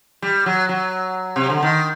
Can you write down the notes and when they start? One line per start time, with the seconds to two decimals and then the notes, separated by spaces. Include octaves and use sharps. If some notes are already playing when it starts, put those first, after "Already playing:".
0.22 G3
0.46 F#3
0.69 F#3
1.36 C3
1.50 D3
1.63 D#3